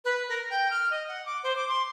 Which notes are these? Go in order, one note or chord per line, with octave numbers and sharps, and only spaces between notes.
B4
A#4
G5
F6
D#5
F#5
D6
C5
D6
C6